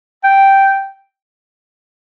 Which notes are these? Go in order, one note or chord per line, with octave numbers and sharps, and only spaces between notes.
G5